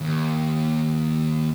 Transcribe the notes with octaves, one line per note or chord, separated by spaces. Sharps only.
D#2